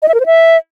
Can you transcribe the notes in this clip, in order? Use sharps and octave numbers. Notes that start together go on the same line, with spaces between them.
D#5
E5
A#4
C5
E5